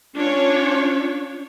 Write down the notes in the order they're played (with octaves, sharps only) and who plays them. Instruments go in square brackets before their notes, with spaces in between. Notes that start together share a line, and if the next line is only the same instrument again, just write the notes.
[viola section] C#4 D4 F4 C#5